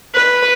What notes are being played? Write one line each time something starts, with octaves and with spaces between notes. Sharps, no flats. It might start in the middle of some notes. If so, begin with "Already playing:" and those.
B4